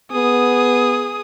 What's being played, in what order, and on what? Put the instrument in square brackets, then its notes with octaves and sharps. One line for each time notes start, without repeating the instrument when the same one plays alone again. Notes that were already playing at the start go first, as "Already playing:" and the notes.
[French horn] B3 [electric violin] G#4 D#6